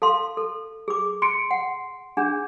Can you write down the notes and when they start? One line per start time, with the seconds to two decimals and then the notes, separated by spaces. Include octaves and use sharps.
0.02 A4 F5 A5 C6
0.37 A4
0.88 G#4 D6
1.22 C6 C#7 D7
1.51 F#5
2.17 D4 G#4 F#5 G6